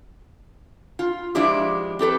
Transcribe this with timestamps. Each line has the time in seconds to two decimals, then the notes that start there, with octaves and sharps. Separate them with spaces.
0.99 F4
1.35 F3 G#3 D4 E4 G4
1.99 C4 G4 A4 B4